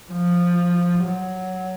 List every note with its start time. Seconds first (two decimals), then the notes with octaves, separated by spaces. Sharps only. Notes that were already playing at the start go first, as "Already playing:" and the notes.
0.12 F3
1.04 F#3